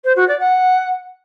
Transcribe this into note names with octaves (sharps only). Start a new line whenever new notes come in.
C5
F#4
D5
F#5